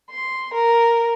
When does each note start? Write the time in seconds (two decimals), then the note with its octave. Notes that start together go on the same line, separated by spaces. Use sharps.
0.11 C6
0.55 A#4